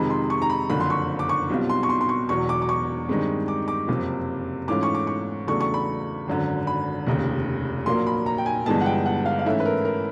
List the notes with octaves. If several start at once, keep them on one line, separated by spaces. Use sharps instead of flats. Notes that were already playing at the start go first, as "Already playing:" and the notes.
Already playing: F2 C3 D#3 G#3 B5
C6
C#6
A#5
B5
F#1 F2 D3 F3 B5
C6
C#6
D6
C#6
B1 B2 G3 C4 F4
C6
C#6
C6
C6
C#6
E1 E2 B2 F#3 C#6
D6
D6
C#6
G2 D#3 G#3 C4
D6
D6
F#1 F2 C3
G#2 E3 A3 C#4 F4 D6
C#6
D6
C#6
E2 C#3 F#3 A3 D4 C#6
C#6
B5
G#1 F#2 D3
B5
F1 D#2 C#3
A#1 A#2 F#3 A#3 C6
B5
A#5
G5
G#5
G1 G2 E3 G#3 B3 A5
F#5
G5
F#5
F5
F5
G#2 E3 A3 C#4 E4 E5
B4
A#4
A#4